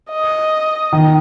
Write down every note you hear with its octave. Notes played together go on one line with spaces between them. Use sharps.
D#5
D#3